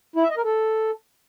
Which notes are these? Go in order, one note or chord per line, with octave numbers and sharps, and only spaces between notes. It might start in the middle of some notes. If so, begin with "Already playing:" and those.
E4
E5
D#5
A#4
A4